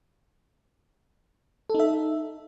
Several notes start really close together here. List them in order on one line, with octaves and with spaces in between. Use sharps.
A4 D#4 E5